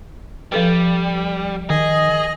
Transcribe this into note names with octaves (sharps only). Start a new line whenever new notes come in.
F3 G3 A4 B4
D#3 G#4 D#5